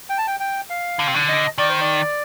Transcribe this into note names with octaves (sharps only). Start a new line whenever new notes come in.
G5
A5
G5
G5
F5
D3
C3
D3
D#5
D#3 D5
C5
D5